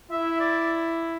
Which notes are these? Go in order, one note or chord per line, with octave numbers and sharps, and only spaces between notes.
E4 E5
D5